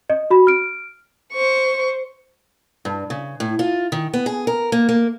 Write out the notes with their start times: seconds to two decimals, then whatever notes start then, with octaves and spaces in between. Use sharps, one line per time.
0.10 D#5
0.30 F#4 B5
0.47 F6 D7
1.33 C5 C#6
2.85 G2
3.10 C#3
3.40 A2
3.59 F4
3.92 D#3
4.13 B3
4.26 G#4
4.47 A#4
4.72 A#3
4.89 A#3